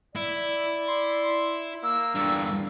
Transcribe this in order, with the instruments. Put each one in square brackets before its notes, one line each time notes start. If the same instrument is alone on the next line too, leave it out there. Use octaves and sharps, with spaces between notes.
[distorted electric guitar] E4 [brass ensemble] D5
[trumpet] C6
[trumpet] A#3 [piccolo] E6
[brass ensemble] E2 [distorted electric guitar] G2 D3